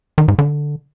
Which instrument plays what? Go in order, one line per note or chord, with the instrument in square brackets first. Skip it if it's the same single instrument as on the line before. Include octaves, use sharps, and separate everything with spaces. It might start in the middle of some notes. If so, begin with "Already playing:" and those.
[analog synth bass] D#3
G#2
D3